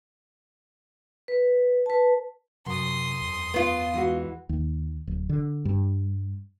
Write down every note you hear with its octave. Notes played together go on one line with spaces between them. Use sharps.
B4
B4 A5
F#2 C3 C6 D#6
E2
B3 F4
E3 G#3 F#4
D#2
D1
D3
G2